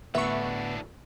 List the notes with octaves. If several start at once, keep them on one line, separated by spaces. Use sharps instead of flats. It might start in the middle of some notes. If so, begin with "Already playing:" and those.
A2 D3 E3 A3 B3 D4 E5 C#6